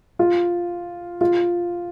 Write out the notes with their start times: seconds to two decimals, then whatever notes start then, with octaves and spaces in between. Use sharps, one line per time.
0.19 F4
1.21 F4